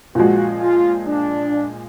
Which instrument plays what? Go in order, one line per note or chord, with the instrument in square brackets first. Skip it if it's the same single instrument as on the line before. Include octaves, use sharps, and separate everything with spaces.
[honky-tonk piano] A#2 F3 G#3 [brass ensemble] F#4
[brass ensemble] F4
D4